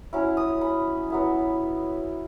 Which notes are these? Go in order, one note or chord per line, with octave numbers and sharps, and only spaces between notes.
F#3 C#4 E4
D#6
B5
F#3 B3 E4